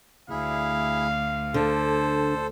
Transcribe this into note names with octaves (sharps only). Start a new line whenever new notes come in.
D2 E4 G#4 F5
D3 A4 C5